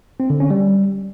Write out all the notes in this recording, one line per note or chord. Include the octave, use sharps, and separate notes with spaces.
C4
D3
C#4
G3